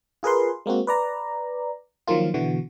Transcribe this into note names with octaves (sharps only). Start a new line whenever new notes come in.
F4 G#4 A#4 B4 C6
G#3 A#3 C4 F#4
B4 D5 A#5
D#3 F3 F#3 A#3 F4
B2 D3 E3 B3 F#4